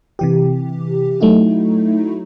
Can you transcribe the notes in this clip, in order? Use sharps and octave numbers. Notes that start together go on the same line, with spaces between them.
C3 E3 G4
F#3 A3 D#4 E4 F#4